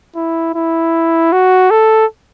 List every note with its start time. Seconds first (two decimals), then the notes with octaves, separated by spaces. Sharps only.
0.16 E4
0.55 E4
1.32 F#4
1.71 A4